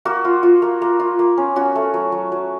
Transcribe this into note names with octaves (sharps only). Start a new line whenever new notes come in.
A#3 F#4
F4
F4
A#3
A#3
F4
A#3
C#4
C#4 F#4
A3
F#3
F#3
F#3